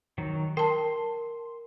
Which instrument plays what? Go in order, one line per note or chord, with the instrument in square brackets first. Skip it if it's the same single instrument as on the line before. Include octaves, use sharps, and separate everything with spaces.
[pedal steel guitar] D#3 F#3
[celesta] A#4 [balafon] G5 A5 [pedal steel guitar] C6